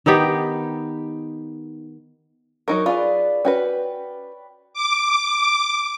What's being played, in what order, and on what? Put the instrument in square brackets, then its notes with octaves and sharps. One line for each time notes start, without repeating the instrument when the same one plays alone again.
[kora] D#3 B3 D#4 G4
[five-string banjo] F#3 D#4 A#4 [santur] C#6
[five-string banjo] F4 G#4 [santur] B4 D5
[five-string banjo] C#4 F#4 B4 [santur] G5
[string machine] D6